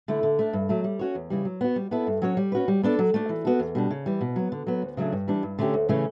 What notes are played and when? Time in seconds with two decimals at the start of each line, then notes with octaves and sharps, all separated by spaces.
0.08 D3 A3 E4
0.23 D3
0.39 A3 D4
0.53 G2
0.69 F#3 A3
0.84 G3
0.99 C#4 F#4 C#5
1.15 E2
1.30 C#3 E3 G3
1.45 F#3
1.61 B3 F#4
1.76 G3
1.91 B3 E4 A4
2.07 G2
2.22 F#3 C#4 F#4 C#5
2.37 G3
2.52 C#4 F#4 B4
2.68 G3
2.83 B3 D4 A4 D5
2.99 F#3
3.14 A3 D4
3.29 E3
3.45 B3 F#4 A4
3.59 E2
3.75 B2 G3 D4
3.91 C#3
4.06 E3 G3
4.21 B2
4.36 F#3 B3
4.52 D3
4.67 F#3 B3
4.82 D2
4.97 C#3 F#3 A3 D4
5.12 G2
5.28 E3 G3 D4
5.43 G2
5.59 D3 A3 C#4 G4
5.74 D2
5.89 C#3 E3 A3 C#4